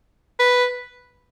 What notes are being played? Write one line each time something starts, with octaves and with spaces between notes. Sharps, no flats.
B4